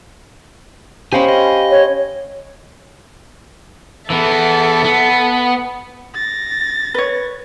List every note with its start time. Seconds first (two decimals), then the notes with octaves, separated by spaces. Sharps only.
1.13 C#4 G4 C5 D#5 F5 G#5 B5
1.28 D#5
1.71 C#5
4.10 E3 B3 A4 E5
4.84 B3
6.15 A6 A#6
6.94 B4 C#5